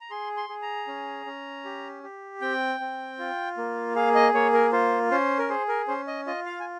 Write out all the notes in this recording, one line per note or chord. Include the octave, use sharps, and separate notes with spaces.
A#5
G#4 C6
C6
G#4
A#5
C#4
C#4
G4
G4
C4 G5
C4
F4
A#3
G#4 F5
D#5
A#3 C#5
A#4
F4 C5
C#4 C5
A#4
G#4 C5
A#4
C#4 C5
D#5
F4 D#5
F5
G#5